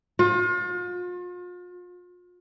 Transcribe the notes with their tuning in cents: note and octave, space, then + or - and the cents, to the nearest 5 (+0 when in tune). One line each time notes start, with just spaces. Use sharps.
F4 +40